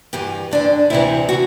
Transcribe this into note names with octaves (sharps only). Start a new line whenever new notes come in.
G2 E3 G4
G2 D3 D4
D2 C3 E3 E4
D3 F#4